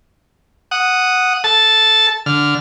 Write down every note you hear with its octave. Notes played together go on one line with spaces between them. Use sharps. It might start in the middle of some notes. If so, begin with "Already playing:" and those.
F#5 D#6
A4 A5
D3 F6